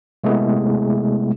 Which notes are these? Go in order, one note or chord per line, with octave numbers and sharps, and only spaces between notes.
C3 G#3 A3 B3 E4 G#4